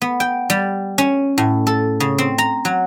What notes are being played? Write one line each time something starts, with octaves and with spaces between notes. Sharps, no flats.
B3
G5
G3
C#4
A2
A4
C#3
C4
A#5
F#3